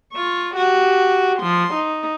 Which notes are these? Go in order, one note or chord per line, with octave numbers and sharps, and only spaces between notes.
F4 C#6
F#4 G4
F3 C6
D#4